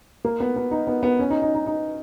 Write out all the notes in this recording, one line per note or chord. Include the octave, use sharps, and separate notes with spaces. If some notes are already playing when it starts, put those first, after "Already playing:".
A#3
B3
B3
D#4
B3
B3
C#4
D#4
D#4
D#4
D#4